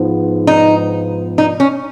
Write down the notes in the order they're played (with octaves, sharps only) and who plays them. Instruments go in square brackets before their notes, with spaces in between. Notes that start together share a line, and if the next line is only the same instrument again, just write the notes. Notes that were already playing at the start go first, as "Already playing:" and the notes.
Already playing: [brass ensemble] G#2 F3 B3
[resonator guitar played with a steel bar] D#4
D#4
C#4